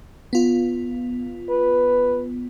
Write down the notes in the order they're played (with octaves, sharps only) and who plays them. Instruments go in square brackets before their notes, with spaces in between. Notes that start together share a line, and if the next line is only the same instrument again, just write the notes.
[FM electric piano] B3 F4
[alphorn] B4